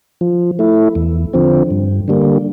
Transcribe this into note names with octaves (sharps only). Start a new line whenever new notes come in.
F3
A3 E4
E2
D3 F3 C4
G2
D3 G3 A#3